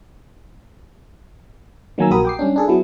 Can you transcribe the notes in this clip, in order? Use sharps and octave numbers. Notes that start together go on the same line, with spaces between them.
D#3 F#3 A#3 G#5 A#5 E6
A#1 F#4 G4 A#4 B5 D#6
G5 D6 C7
G3 C#4 D4
D4 G#4 A4
F#3 B3 E4